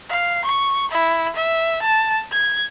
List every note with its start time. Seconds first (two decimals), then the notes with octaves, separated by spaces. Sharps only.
0.10 F5
0.45 C#6
0.91 E4
1.36 E5
1.82 A5
2.32 G#6